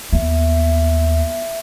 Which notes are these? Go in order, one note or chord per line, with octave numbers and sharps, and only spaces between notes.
D#2 B3 E5